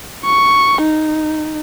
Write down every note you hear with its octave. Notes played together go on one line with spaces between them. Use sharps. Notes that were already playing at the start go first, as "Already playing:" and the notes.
C#6
D#4